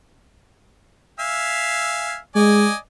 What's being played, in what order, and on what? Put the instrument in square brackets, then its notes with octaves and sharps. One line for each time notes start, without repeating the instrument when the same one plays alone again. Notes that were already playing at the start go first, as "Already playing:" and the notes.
[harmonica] E5 F5 G#5
[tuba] G#3 [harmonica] D5 D#5 G#5